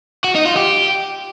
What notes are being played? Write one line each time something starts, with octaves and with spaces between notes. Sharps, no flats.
F#4
D#4
F4
G4